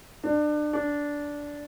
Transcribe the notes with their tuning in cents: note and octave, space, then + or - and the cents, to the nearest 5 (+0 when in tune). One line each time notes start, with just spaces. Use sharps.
D4 +30
D4 -10